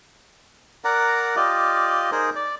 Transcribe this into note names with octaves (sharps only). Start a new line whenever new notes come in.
A#4 D5 F#5 A#5
F4 G4 D5 D#5
D#4 G#4 A#4 C5
D5